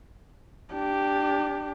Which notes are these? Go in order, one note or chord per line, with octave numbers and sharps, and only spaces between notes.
D4 G4